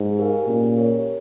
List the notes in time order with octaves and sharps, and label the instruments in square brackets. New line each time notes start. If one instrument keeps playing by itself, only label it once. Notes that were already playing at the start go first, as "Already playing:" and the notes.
Already playing: [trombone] G#2
[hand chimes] G4 A#4 F5 G#5
[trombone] A#2 [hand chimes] A#3 C#4 G#4
[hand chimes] G4 A#4 C#5